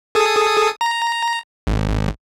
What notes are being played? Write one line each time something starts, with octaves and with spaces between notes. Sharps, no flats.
G#4 A4 D#6
A#5
G#1